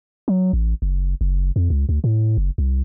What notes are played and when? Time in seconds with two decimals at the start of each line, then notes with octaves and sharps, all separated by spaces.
0.28 F#3
0.53 A1
0.82 F#1
1.21 F#1
1.56 F2
1.70 C#2
1.89 D2
2.04 A2
2.38 F#1
2.58 C2